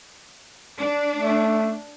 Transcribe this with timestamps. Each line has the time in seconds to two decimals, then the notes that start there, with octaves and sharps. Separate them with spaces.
0.77 D4
1.16 A3